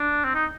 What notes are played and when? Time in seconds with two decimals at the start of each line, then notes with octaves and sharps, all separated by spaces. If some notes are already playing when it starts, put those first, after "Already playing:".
Already playing: D4
0.24 C4
0.34 D#4